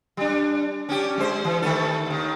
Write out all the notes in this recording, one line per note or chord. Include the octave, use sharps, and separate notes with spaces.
G3 D4
C#4 D4 G4
G#3 C5
E3
D#3 A3 A4
D#2 D#3